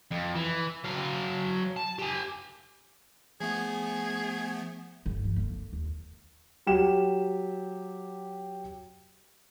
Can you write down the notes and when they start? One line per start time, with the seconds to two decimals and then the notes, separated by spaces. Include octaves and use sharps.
0.11 F2
0.35 E3
0.84 F#3 F5
1.76 A5
1.99 G4 G#5
3.40 F3 A3 B3 G#4
5.06 G1
5.24 F3
5.36 D3 A#3
5.73 D#2
6.67 F#3 G4 E7